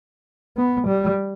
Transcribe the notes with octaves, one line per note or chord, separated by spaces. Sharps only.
B3
G3